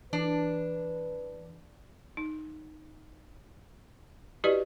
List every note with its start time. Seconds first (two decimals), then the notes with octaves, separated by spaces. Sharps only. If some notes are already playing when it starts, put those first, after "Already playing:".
0.13 E3 D4 B4
2.17 D#4
4.44 E4 F#4 G4 B4 D5 D#5